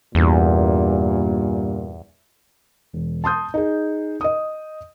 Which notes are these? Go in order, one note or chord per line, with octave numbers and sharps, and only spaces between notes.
E2 G2 A#2
E1
A5 C6 D#6 G6
D#4 G#4
D#5 D#6